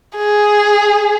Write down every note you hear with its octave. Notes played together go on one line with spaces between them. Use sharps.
G#4